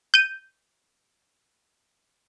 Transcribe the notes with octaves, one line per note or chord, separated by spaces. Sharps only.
G6 D#7